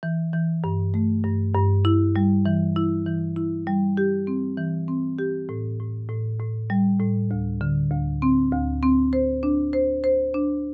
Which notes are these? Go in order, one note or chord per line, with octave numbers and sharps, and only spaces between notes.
E3
E3
G2
A3
G2
G2
E4
G3
E3
E4
E3
E4
G3
G4
C4
E3
C4
G4
A2
A2
A2
A2
G3
A2
D2
D3
D2
C4
D2
C4
C5
D4
C5
C5
D4